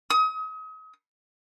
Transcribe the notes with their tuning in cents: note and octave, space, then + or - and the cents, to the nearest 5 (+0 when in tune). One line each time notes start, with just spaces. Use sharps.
D#6 +35